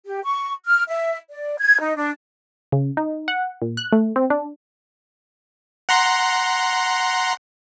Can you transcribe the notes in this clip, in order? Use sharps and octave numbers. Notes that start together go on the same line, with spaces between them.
G4
C#6
F6
E5
D5
G#6
D#4
D4
C#3
D#4
F#5
A#2
F#6
A3
C4
D4
F#5 A#5 C6